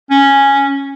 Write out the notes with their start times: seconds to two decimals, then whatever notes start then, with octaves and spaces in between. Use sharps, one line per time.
0.11 C#4